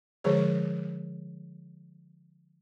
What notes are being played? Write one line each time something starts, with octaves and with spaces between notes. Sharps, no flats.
D3 F3 G#3 G#4 C5 C#5